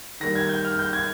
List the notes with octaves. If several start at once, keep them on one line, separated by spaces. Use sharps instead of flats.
D#3 G3 A#3 A#6
G#6
G6
F6
G6
G#6